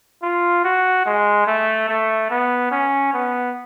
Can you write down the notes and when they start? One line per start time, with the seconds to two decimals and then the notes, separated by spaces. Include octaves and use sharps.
0.23 F4
0.64 F#4
1.06 G#3
1.47 A3
1.89 A3
2.30 B3
2.71 C#4
3.13 B3